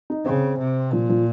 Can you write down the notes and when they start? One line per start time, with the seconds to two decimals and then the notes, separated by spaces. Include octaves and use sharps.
0.10 D#4
0.26 C#3 C4
0.59 C3
0.93 A#2 F3
1.09 F3